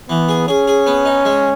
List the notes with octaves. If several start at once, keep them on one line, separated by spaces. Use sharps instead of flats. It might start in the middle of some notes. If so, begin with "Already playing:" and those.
E3 B3
G#4
C#4 G#4
G#4
B3
D#4
G#3